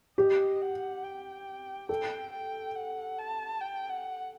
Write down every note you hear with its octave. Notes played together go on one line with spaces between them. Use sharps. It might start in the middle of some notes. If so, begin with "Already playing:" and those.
G4 D#5
F#5
G5
A4 G5
G5
F#5
A5
G5
F#5